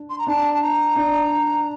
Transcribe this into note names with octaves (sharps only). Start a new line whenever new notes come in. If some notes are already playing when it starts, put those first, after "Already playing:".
Already playing: D4
C6
A#5
D4 A5
A5
A#5
D4